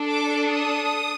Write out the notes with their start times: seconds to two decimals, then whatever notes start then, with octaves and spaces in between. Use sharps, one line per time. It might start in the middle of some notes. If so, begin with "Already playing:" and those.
Already playing: D4 A4
0.08 D6
0.50 D#6